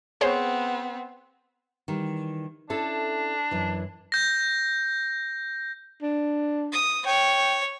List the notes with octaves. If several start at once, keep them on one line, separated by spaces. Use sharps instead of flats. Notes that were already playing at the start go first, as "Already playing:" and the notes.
B3 C4 G#4 C5 C#5
D#3 E3 G3
C#4 D4 E4 A4
F#2 E3
G6 A#6
D4
D#6
C#5 G5